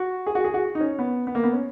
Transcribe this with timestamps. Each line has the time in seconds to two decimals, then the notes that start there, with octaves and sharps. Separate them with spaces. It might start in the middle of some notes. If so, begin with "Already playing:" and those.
Already playing: F#4
0.27 G#4
0.35 F#4
0.44 G#4
0.54 F#4
0.75 D#4
0.81 C#4
0.99 B3
1.27 B3
1.35 A#3
1.44 B3
1.53 C#4